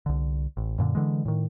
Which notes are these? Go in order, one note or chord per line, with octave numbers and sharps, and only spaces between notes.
C2 D3
A1
F#2 A#2 D3
D3 E3 G#3
A2 D#3